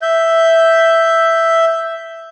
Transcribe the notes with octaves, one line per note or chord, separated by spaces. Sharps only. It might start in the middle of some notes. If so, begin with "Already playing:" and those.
E5 G6